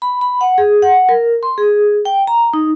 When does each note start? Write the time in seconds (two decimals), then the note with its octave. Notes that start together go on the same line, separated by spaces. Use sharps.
0.02 B5
0.21 B5
0.41 F#5
0.58 G#4
0.82 F#5
1.09 A#4
1.43 C6
1.58 G#4
2.05 G5
2.27 A#5
2.54 D#4